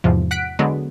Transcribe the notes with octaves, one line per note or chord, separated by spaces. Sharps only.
E2 G#2 C3 F3
F#5 F#6 B6 D7
D3 F#3 G#3 B3 F#4